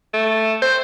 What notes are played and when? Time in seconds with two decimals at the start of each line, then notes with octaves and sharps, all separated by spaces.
0.14 A3
0.62 C5